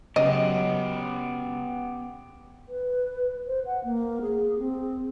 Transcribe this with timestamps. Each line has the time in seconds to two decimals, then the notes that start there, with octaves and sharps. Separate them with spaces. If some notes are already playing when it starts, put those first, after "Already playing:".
0.16 C#3 F#3 B3 C#4 G4 D#5
2.69 B4
3.47 C5
3.66 F#5
3.84 A#3
4.21 G#4
4.59 C4